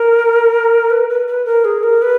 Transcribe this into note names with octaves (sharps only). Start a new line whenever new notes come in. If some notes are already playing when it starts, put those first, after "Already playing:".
Already playing: A#4
B4
B4
B4
A#4
G#4
A#4
B4